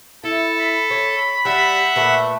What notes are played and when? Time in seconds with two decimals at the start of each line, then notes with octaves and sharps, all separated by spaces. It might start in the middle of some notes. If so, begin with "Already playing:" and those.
0.24 E4 A4
0.60 B5
0.91 C#5
1.45 G3 E5 F#5
1.96 A#2 A3 B4